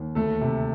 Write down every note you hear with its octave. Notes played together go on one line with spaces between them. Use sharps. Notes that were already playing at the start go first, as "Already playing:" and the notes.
Already playing: D#2
D2 A3 A4
C3